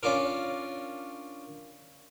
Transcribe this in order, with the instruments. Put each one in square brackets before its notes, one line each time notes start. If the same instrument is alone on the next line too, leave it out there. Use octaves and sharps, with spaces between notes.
[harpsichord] C#4 D4 F4 A#4